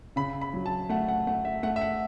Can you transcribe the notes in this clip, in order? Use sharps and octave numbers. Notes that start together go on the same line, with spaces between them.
C#3 B5
B5
F#3
A5
A3 F#5
F#5
A3 F#5
E5
A3 F#5
E5
F#5